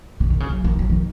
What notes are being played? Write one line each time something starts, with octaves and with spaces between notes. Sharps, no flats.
C#3
D#3
C#3
F#3
D#3
F#3
D#3